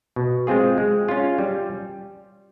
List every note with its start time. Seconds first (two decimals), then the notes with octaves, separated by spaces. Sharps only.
0.16 B2
0.47 G#3 C4 F4 G#4
0.78 G#3
1.09 C#4 F4
1.38 G3